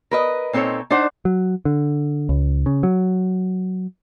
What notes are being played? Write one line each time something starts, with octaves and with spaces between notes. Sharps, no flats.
A#4 B4 D#5
A#2 C4 D#4 A4 C#5
D4 D#4 C5 F#5
F#3
D3
C#2
C#3
F#3